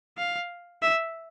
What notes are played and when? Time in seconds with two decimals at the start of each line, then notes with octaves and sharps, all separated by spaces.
0.18 F5
0.82 E5